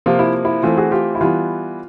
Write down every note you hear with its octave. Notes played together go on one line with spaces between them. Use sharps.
C3 F3 A#3 F4
E4
E4
E3 A3 C4 F4
F#4 G#4
F4 G4
E4
E3 G3 B3 F4